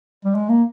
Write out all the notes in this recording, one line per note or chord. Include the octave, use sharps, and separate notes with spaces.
G3
G#3
A#3